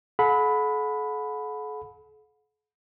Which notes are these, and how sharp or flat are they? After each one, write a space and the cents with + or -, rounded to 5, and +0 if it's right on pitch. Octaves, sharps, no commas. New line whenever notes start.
A4 -45 F#5 -35 B5 +5